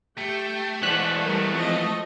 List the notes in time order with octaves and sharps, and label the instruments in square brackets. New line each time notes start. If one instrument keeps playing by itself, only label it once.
[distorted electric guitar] A3 [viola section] G4 G5
[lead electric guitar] E3 G#3 [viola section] C5 D5 F#5 [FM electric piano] F#6 B6
[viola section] G3 A#4
F3 C4 D#5